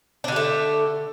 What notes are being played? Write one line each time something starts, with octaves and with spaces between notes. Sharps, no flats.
D3 A3 D4 G4